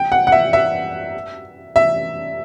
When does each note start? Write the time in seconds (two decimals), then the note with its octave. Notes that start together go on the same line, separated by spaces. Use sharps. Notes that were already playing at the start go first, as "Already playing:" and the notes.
Already playing: G5
0.12 F#5
0.27 F#5
0.32 E5
0.53 E5
1.76 E5